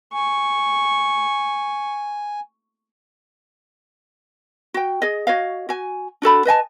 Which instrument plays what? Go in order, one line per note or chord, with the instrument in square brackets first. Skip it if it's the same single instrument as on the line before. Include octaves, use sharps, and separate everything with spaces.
[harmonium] G#5 [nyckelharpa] C#6
[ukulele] F#4 G5
G#4 D#5
F#4 C#5 D#5 F5
F#4 G#5
D4 F#4 A4 B5
B4 D#5 G#5 A5